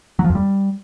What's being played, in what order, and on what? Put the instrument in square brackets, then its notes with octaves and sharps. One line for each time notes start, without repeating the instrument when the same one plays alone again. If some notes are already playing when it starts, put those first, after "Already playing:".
[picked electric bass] F#3
F3
F2
G3